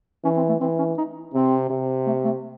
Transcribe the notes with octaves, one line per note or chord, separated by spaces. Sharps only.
E3 C#4
C4
A3
E3 C4
C#4
D#4
C3 C4
C3
A3
A3